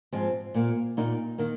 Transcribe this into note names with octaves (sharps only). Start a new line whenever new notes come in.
G#2 F3 G#3 C4
A#2 A#3
A#2 A#3 D#4
D#3 A#3